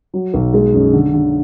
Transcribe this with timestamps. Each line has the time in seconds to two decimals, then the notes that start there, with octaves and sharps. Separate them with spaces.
0.14 F#3
0.34 B1
0.54 G#3
0.74 F#2
0.93 D3
1.13 D3